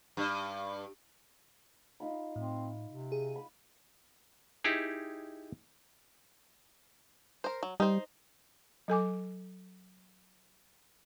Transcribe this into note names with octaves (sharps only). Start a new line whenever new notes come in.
G2
D#4 F4 B5
A2 C4
C3
G#4
B5
D#4 E4 G4 G#4
A#4 C5
F#3
G3 D#4 C5
F#3 A4 G#5 D6